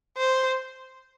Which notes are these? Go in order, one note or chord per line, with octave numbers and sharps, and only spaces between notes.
C5